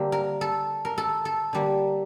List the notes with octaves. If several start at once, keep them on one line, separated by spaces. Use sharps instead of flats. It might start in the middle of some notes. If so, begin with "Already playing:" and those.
Already playing: D3 G3 A#3 C5
A#4
A4
A#4
A4
A4
D3 G3 A#3